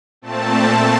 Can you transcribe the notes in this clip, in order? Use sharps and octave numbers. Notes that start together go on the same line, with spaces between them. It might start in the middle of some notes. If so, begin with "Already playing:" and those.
A#2 A3 C4 A5